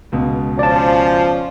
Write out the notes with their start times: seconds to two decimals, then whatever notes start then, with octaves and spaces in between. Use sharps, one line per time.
0.12 C#2 B2
0.59 F3 C#4 D5 A5